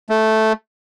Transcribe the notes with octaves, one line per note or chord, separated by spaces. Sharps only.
A3